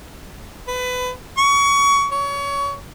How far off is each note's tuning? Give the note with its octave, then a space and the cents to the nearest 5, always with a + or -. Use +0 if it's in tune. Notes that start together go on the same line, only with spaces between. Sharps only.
B4 +25
C#6 +25
C#5 +25